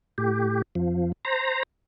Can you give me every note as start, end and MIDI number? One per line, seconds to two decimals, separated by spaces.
0.18 0.62 45
0.18 0.62 67
0.75 1.12 41
0.75 1.12 53
1.25 1.63 72
1.25 1.63 82